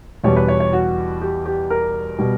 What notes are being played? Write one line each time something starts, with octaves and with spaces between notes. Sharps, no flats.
E2 B2 G3 C#5
B4
C#5
C#5
F#4
G4
G4
A#4
B2 G3